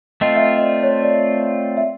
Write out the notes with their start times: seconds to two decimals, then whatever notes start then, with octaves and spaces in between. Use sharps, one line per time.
0.21 A3 C4 F4 D#5
0.37 E5
0.42 D#5
0.57 D#5
0.62 D5
0.83 C#5
1.03 D5
1.77 E5